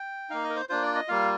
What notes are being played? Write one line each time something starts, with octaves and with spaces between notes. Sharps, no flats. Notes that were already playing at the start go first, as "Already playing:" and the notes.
Already playing: G5
A#3 D#4 F5
D#5
A#4
C5
A#3 D4 F4 C5
D5
D#5
G3 A#3 F4 F5